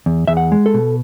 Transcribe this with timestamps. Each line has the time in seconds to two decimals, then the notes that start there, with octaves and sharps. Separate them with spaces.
0.06 E2
0.28 E2 E5
0.37 F#5
0.52 G#3
0.66 A4
0.74 B2